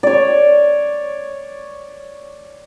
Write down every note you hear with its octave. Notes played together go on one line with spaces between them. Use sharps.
C#5 D5